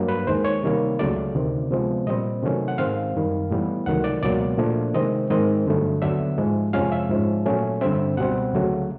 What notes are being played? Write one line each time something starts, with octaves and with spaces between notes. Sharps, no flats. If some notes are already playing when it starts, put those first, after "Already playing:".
Already playing: G2 F#3 A#3 D4
B4
D#2 D#3 G#3 C5
C#5
C3 D#3 G3 A#3
C#2 C#3 F#3 A3 D5
D2 C3 D#3
C3 F3 G#3 B3
A#2 G3 C4 D#5
C3 D#3 F#3 A3 C#4
F#5
G#2 D#3 G#3 C4 F5
F#2 D#3 G3
A2 E3 G3 B3
C#2 C3 D#3 F#3 A3 F#5
D5
C#2 B2 F#3 A#3 D5
A#2 F3 A3 D4
C3 D#3 G#3 C4 D#5
G#2 D#3 G#3 C4 D#5
G2 D3 F#3 A3
D#2 D3 F#3 B3 D4 E5
G#2 F3 G#3
F2 C3 F3 G#3 C#4 F5
E5
G#2 F3 G#3 C#4
A#2 F#3 A3 C#4
G2 D3 G3 C4 E5
C#2 B2 G3 C4 F#5
D2 C#3 F#3 A3